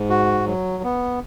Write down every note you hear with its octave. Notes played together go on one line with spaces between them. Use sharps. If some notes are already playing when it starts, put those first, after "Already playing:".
Already playing: G#2
F#4
F#3
B3